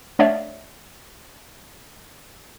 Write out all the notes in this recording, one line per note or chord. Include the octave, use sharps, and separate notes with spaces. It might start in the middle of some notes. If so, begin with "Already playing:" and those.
A3 D4 C#5 D5 E5 F5